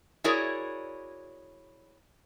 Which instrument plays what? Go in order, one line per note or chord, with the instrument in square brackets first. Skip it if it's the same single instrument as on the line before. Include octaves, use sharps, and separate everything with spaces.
[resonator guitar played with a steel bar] E4 F#4 G#4 A#4 C#5 D5